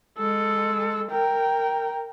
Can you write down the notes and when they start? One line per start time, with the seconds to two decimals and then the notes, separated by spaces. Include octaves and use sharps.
0.18 G#3 A4
1.11 A#4 G5